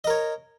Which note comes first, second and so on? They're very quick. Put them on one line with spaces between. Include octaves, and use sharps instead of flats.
D#5 A#4 C#5